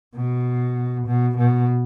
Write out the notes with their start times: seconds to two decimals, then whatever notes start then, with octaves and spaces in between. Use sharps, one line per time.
0.16 B2
1.07 B2
1.37 B2